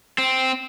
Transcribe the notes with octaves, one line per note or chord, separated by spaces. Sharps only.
C4